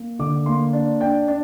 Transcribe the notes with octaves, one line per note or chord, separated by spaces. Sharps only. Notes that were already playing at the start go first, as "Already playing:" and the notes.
Already playing: A#3
D3 D6
A#3 C6
D4
D4 G5
D4